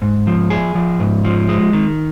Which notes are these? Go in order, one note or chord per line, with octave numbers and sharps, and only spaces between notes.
G#2
F3
G#4
F3
G#2
F3
G#3
D#3